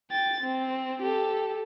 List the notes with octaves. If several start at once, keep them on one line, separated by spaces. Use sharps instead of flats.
G5 A6
C4
G4 A4